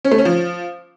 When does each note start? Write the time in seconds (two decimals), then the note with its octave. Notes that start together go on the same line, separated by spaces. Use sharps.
0.05 C#4
0.11 A3
0.18 C#4
0.25 F3